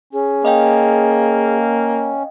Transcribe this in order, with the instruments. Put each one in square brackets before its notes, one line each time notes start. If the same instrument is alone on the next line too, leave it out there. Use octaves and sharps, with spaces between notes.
[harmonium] C#4 [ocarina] G#4
[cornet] A#3 [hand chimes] D#5 F5 G5